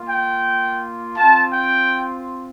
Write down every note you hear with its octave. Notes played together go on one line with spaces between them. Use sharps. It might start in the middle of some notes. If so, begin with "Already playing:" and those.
Already playing: A#3 F4
G5
C4 F4 A5
G5